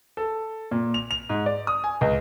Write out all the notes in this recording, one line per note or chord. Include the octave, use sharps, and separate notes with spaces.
A4
A#2
F7
F7
G#2
D5
D#6
G#5
C#2